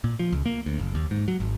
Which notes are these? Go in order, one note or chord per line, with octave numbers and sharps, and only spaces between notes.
A#2
F3
C#2
A#3
D2
F#1
D#2
G#2
F#3
G#1